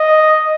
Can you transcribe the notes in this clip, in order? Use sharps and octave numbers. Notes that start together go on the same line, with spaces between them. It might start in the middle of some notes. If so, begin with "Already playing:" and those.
Already playing: D#5